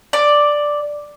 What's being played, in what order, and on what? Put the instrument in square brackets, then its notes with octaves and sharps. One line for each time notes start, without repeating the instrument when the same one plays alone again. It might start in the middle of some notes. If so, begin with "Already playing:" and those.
[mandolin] D5